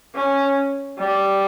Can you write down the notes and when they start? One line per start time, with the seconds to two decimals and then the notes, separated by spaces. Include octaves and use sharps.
0.16 C#4
0.99 G3